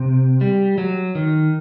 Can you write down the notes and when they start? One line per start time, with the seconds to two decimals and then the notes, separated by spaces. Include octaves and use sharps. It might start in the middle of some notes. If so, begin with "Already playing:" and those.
Already playing: C3
0.41 G3
0.78 F#3
1.15 D#3